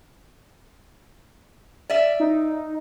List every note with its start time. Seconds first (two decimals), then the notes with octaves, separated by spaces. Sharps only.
1.90 D5 E5
2.20 D#4